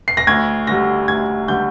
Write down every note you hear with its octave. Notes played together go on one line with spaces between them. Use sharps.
C7
A#6
D2 G#6
D3 G3 A#6
D2 G#6
D3 G3 G6